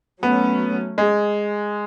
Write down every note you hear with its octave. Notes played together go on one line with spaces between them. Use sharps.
F#3 A3 B3 C#4
G#3